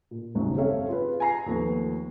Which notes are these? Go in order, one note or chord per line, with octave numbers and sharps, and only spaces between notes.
A#2
F#1 D#2 G#2 F#3 C#4
C4 G4 A4 C#5 E5 F5
F4 G#4 B4
G#5 A#5 C7
D#2 F3 A3 B3